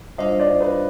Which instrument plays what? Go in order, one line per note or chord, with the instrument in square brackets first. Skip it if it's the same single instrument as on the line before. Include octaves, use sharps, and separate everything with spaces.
[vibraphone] G3 D4 F4 C5 F5 [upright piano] D#5
[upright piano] D5
B4